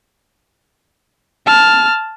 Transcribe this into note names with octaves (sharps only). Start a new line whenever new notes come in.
A5 F6